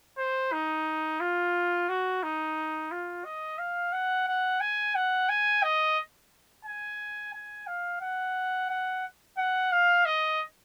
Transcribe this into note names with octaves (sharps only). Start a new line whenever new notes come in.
C5
D#4
F4
F#4
D#4
F4
D#5
F5
F#5
F#5
G#5
F#5
G#5
D#5
G#5
G#5
F5
F#5
F#5
F#5
F5
D#5